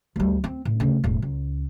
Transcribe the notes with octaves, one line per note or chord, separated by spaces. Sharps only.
D2 G3
C4
A2
D2 C#3
E1 A2
C#2